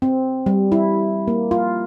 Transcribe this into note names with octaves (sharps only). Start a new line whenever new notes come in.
C4
G3
E4
A#3
F4